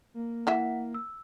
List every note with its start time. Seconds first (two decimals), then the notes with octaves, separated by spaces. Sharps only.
0.14 A#3
0.47 E3 E4 E5 F#5 B6
0.94 E6